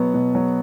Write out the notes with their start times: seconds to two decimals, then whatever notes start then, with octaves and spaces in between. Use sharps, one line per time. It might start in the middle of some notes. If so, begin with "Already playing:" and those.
Already playing: B2 F#3 B3
0.14 B2
0.35 F#3